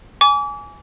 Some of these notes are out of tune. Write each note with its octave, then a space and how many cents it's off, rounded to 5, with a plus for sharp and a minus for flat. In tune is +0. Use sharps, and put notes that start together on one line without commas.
G#5 +0 D6 -35